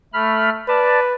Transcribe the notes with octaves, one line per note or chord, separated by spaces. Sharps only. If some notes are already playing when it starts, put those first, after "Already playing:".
A3 B5 F6
B4 D5 A5